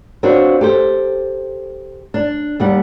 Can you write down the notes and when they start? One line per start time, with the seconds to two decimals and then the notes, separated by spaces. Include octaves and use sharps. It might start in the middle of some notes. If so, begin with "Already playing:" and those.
0.23 C4 D4 F4 F#4 B4 C#5
0.61 G4 A4 C5
2.14 D4
2.60 D#2 G3 F#5